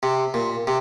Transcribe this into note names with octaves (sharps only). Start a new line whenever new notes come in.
C3
A#2
C3